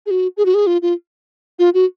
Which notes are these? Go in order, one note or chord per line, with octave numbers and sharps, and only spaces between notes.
G#4
F#4
G#4
F#4
G#4
F4
F4
F4
F#4